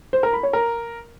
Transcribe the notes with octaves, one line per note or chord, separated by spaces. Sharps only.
C5
A#4
B5
C#5
A#4